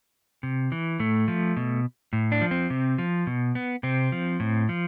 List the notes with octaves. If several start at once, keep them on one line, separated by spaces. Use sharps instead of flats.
C3
E3
A2 A3
F3
B2
A2
D4
F3
C4
C3
F3
B2
B3
C3 C4
F3
A2
F3